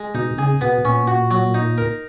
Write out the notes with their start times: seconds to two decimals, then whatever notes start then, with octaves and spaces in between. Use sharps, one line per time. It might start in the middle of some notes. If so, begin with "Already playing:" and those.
Already playing: G#3
0.14 B2 D#4
0.38 C#3 G#4
0.61 B2 B3
0.85 A#2 C#4
1.08 F#4
1.31 F#3
1.54 D#4
1.78 A#4